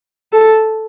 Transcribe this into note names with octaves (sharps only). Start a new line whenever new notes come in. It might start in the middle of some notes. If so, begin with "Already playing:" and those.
A4